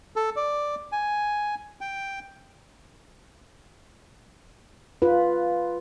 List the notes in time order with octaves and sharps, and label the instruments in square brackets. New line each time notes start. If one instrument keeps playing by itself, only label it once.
[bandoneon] A4
D5
G#5
G5
[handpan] F4 B4